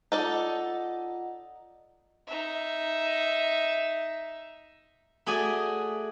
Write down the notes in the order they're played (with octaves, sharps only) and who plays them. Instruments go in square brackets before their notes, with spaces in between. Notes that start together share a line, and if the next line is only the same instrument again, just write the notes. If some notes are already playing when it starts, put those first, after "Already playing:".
[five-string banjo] D#4 A4 D5 [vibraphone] F4 F#5 [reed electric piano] D#5
[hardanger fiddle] D#4 E5
[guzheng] A3 F#4 G#4 D5 G#5